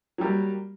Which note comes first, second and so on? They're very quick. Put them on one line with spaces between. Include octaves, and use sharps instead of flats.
F#3 G3 A#3